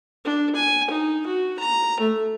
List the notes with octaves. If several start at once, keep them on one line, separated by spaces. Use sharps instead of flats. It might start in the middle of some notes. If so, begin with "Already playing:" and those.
D4
G#5
D#4
F#4
A#5
A3